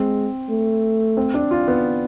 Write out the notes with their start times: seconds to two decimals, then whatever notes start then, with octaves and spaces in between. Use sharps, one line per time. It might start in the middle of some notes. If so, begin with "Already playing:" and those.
Already playing: G#3 C4
0.50 A3
1.17 C4
1.34 D4
1.51 F4
1.68 B3